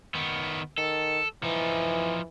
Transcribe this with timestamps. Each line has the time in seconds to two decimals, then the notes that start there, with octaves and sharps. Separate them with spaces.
0.15 D#3 B3
0.78 D#3 A4
1.44 E3 F3 D#4